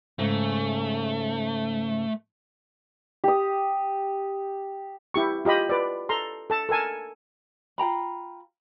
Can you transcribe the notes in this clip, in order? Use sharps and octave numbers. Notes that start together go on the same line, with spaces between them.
G#2 C#3 A3
G4 D#6
E4 G4 C#6
F4 G4 D#5 B5
B4 D5
A4 A#5 C6
A4 A5
A4 A#4 G#5 A5
F4 G5 A#5 B5